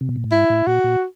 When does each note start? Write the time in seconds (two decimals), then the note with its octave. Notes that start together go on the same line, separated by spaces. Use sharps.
0.01 C3
0.09 B2
0.16 A#2
0.24 A2
0.32 G#2 E4
0.50 A2
0.67 A#2 F#4
0.84 A#2